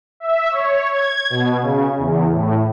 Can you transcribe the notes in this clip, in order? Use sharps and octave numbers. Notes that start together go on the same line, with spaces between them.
E5
C#5
G#6
B2
C#3
E2
A2